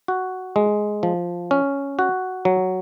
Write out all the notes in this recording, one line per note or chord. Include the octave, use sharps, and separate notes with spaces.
F#4
G#3
F3
C#4
F#4
F#3